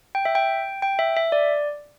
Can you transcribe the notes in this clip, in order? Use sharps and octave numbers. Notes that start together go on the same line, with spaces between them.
G5
E5
G5
G5
E5
E5
D5